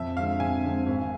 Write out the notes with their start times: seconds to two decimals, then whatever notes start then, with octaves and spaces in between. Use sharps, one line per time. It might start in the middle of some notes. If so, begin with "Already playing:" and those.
Already playing: F2 E5
0.17 D3 G#3 C4 F5
0.40 F2 G#5
0.64 D3 G#3 C4
0.86 G#1